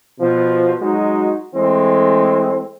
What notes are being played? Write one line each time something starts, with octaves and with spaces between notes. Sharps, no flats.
B2 F3
F#3 G#3 D#4 F#4
E3 G#3 A3 C4